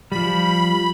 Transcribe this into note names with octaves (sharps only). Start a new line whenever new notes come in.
F3 G3 B5